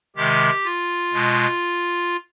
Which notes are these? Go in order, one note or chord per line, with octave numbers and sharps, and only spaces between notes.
C3 D#3 G#3 G4
F4
B2 G#3